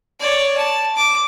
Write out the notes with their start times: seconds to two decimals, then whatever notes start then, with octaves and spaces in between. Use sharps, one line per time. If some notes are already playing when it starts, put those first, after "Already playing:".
0.19 C#5 D5
0.57 A5
0.96 D6